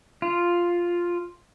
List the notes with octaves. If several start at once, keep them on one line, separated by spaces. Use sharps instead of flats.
F4